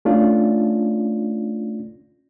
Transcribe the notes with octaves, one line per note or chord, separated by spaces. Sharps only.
A3 C#4 D4 F4 D5